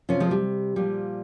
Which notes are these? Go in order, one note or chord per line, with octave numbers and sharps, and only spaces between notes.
C3 F3 C#4 F4
F3 G#3
G3
A#2 F3 G3